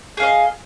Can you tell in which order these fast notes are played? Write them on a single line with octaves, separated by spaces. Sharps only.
G#4 F5 D#5